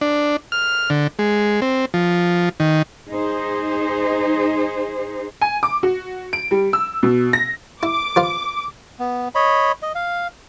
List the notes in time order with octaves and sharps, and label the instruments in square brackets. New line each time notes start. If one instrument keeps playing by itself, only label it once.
[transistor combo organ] D4
F6
D3
G#3
C4
F3
D#3
[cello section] D#4 G#4 C5
[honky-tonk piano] G#5
D6
F#4
D7
G3
E6
B2
A#6
[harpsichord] E4 [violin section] D6
[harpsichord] F3 F4 B4
[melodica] B3
C#5 D#5 B5
D#5
F5